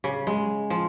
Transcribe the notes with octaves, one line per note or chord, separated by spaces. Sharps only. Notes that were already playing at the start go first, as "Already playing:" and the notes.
C#3
G#3
F3